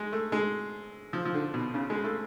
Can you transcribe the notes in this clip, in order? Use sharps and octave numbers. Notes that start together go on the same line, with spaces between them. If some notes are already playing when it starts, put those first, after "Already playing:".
Already playing: G#3
A3
G#3
F3
F3
D3
B2
C#3
G#3
A3